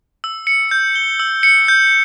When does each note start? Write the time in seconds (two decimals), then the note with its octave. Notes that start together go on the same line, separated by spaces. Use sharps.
0.24 E6
0.47 C#7
0.71 G6
0.95 G7
1.20 E6
1.43 C#7
1.68 G6